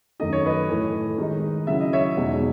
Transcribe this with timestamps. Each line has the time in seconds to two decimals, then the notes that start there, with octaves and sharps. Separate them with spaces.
0.19 F#2 D#3 A3 D#4 D#5
0.33 C#5
0.46 B4 D#5
0.69 A2 E3 A3
1.18 D#3 G#3 D#4
1.67 C#3 F#3 C#4 E4 E5
1.80 D#5
1.93 C#5 E5
2.16 E2 B2 G#3 D#4